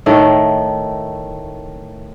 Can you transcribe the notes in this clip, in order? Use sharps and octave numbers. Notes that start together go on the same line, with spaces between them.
A2 D#3 A3